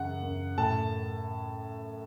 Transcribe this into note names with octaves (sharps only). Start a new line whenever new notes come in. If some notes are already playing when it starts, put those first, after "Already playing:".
Already playing: F#2 C#3 E3 F#5
F#2
A2 A5